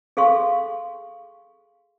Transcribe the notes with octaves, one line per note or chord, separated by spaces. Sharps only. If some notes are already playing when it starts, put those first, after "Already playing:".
G#4 A4 F5 C6 C#6